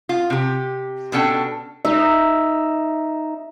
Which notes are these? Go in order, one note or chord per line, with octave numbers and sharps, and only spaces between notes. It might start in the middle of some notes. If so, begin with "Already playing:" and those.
F4
C3 G4
B2 C#4 D4 A4 G5
D#4 E5